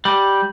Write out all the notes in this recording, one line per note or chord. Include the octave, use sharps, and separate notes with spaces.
G3